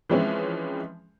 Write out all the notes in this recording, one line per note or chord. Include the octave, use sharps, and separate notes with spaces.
E3 F3 G#3 C4 C#4 E4